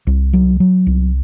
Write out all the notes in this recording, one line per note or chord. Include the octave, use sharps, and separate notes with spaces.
C2
F#3
F#3
C2